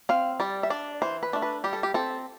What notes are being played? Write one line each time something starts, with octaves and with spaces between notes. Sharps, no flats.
C4 F5
G3 D5
E5
D4 D5
E3 C5
B4
A3 D4
B4
G3 G4
A4
G4
C4 A4